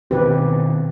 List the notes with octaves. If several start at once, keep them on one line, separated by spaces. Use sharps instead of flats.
B2 D#3 C4 G4 B4